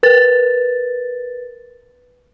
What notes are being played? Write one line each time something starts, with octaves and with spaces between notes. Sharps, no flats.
A#4 B4 A6